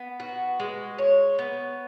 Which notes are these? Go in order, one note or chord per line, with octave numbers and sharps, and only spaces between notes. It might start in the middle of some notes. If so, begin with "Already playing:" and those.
Already playing: B3
F#4
G#3
C#5
B3